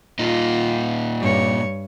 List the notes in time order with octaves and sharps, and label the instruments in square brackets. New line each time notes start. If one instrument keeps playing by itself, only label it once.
[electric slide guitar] A#2 D#4 [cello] F4
[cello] G2 C#5